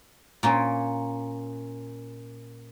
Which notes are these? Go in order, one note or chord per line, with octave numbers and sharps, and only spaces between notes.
A#2 A#3 C#4